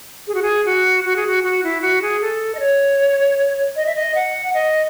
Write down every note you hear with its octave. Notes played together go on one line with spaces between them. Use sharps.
G#4
F#4
G#4
F#4
F#4
G#4
F#4
F#4
E4
F#4
G#4
A4
D#5
C#5
D#5
E5
D#5
F#5
D#5